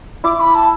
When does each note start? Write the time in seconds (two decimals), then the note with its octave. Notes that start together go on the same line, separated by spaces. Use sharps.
0.24 E4 D6
0.39 B5
0.55 A5